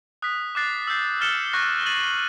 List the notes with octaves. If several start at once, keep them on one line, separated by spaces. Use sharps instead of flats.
D#6 F#6 B6
D6 F#6 A6 C7
E6 G6 C7
F6 A6 C#7 E7 G7
C#6 F#6 A#6
A6 C7 D#7 F#7